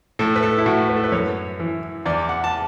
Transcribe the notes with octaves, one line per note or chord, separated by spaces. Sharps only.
A2 A4
B4
A4
E4
A2 F#4
B4
A4
B4
F#2 C#5
E3
E2 D5
F#5
A5